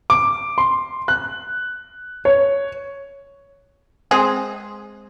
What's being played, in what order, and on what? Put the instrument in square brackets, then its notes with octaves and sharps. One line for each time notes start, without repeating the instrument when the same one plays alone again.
[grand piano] D6
C6
F#6
C#5
[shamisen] G#3 C4 G#4